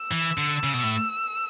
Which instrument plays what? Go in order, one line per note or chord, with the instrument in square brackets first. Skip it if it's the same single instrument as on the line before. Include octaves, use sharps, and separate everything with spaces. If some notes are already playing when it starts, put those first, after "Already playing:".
Already playing: [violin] E6
[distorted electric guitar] E3
D3
C#3
B2
A2